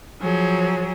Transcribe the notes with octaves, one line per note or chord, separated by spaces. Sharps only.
F3 F#3 G#4